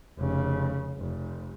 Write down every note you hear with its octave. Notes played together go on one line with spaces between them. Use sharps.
F1 C#3
F1